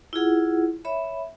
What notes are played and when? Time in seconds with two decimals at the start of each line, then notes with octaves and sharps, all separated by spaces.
0.13 E4 F4 G#4 F#5
0.85 C#5 E5 B5